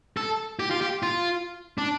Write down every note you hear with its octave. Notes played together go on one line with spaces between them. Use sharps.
A4
G4
F4
G4
F4
D4